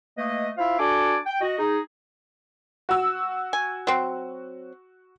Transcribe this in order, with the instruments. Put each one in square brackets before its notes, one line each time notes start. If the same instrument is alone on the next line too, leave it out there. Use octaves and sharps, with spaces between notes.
[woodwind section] A3 A#3 B4 D#5
E4 F4 C5 E5 F5
D4 F#4 A4 D5 G#5 D6
G5
F#4 D#5
D#4 G#4
[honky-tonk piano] F#4 E6
[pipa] G#5
F#3 C4